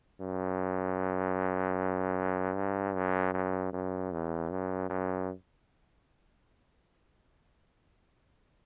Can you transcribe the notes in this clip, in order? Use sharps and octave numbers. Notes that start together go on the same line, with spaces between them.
F#2
G2
F#2
F#2
F#2
E2
F#2
F#2